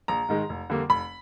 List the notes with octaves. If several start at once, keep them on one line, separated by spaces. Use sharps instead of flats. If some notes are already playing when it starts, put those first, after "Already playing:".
A#1 A#5
G#2 D#3 G#3
F1
F2 D3 G3 A#3
F1 B5